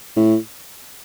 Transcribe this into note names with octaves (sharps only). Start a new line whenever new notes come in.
A2